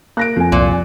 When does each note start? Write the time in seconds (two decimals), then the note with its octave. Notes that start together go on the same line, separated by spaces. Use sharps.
0.17 A#3 F#6 A#6 D7
0.36 F2 F3 G#5
0.52 C2 A#2